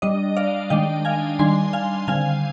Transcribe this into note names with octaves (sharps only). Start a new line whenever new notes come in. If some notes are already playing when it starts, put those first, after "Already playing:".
G3 D4 D#5
D5 F5
D#3 G#3 D4 D#5 G5
F5 G#5
D#3 G3 D4 G#5 C6
F5 G#5
D3 G3 C4 F5 G#5